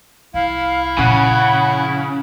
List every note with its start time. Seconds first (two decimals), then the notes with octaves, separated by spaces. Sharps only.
0.34 C2 E4 F5
0.98 A#2 C#3 F3 F#5